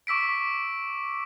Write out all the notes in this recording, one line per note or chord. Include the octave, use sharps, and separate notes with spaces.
C#6 D6 E6 B6 D7